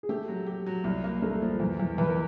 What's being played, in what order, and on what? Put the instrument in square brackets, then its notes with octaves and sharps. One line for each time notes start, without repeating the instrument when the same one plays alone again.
[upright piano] G#4
[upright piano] A3 A4 [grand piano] G4
[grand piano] F#3
G4
F#3
C2
A#3
[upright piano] A3 A4 [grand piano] A#3
[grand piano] F3
E2
E2
[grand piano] E2 [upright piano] B4
[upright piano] A#4